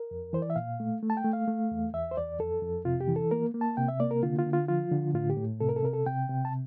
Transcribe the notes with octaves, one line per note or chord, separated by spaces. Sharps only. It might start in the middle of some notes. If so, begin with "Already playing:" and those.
Already playing: A#4
F2
E3 C5
D5
E5
A#2 F5
A3
A3
A5
G5
A3
F5
A3
E2
E2 E5
C5
E2 D5
F2 A4
F2
C3 F4
G4
E3
A4
A#3 A#4
A#3
A5
C3 G5
E5
A#3 D5
A#4
D3 F4
F4
D3
F4
F3 F4
D3
A2 F4
G4
A2
C3 A4
A#4
A4
C3 A#4
A4
C3 G5
C3
A5